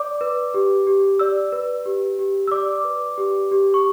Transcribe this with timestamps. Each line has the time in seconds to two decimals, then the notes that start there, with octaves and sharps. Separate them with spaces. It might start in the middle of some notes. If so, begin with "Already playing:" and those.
Already playing: D5 D6
0.21 B4
0.54 G4
0.87 G4
1.19 D5 E6
1.52 B4
1.86 G4
2.19 G4
2.47 E6
2.51 D5 D6
2.84 B4
3.18 G4
3.51 G4
3.74 C#6